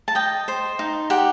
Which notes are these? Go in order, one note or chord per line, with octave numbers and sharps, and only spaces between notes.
A5
D#5 G5
C5
D#4
G4 F#5